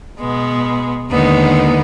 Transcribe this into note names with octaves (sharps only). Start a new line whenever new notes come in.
B2 G#3 B3
D#2 D3 G#3 B3 D#4